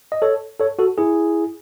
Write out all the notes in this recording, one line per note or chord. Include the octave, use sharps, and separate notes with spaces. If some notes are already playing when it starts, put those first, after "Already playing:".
D#5
A4 C#5
A4 C#5
F#4 A4
E4 G#4